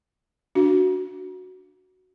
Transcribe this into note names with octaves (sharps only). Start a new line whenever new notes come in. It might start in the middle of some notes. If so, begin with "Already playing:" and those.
D4 F#4